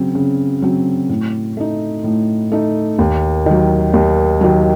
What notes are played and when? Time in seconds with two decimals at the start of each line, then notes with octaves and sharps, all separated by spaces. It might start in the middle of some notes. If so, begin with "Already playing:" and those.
Already playing: C#3 F#3 C4
0.15 C#3
0.62 F#3 C4
1.09 A2
1.57 A3 D#4
2.04 A2
2.52 A3 D#4
2.99 D#2
3.46 D#3 F#3
3.94 D#2
4.41 D#3 F#3